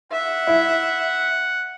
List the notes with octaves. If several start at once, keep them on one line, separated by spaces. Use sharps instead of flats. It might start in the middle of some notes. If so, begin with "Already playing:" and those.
E5 F#5
E4